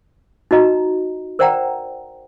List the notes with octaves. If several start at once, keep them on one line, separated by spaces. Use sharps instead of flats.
D#4 F#4 D#5 A#5
A#4 C5 D5 F#5 G5 A#5